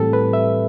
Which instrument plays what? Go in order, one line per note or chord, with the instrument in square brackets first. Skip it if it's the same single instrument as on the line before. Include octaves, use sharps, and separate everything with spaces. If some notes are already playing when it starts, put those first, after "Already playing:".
Already playing: [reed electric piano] A2 E3 G3 C4 G4 A4
B4
E5